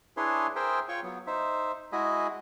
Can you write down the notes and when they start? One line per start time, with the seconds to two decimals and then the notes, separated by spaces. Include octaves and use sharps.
0.17 D4 E4 G#4 B4 C#5 C6
0.56 G#4 A#4 C5 E5 G5
0.89 F4 C#5 G5 C#6
1.03 F#3 B3
1.27 D#4 C5 E5
1.92 G#3 E4 F#4 G#4 D#5 B5